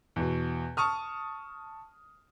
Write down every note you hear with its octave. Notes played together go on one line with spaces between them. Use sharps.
E2 B2
A5 C#6 D#6 F6